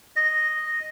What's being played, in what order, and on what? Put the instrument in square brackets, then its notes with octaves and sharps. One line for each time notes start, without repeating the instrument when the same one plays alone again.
[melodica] D#5